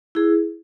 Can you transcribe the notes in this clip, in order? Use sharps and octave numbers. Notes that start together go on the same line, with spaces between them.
E4 G#4